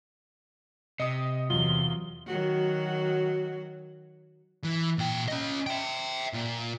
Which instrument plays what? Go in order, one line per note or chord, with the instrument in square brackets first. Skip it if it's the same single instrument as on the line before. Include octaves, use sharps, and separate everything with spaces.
[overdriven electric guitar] C3 [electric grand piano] D#5 D#6
[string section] E2 [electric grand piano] F#3 F4 [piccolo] G7
[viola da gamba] D#3 F#3 F#4
[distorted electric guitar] E3
A#2 G5
C#4 D#5
E5 G5
A#2